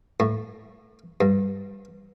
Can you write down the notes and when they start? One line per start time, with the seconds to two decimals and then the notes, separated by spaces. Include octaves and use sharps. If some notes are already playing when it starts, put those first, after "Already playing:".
0.20 A2
1.21 G2